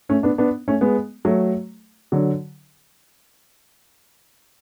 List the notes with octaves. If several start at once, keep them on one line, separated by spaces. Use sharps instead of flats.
A3 C#4
B3 D4
B3 D4
A3 C#4
G#3 B3
F#3 A3
D3 F#3